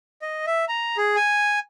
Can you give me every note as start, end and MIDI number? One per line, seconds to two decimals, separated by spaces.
0.22 0.46 75
0.47 0.65 76
0.68 0.97 82
0.97 1.16 68
1.16 1.59 80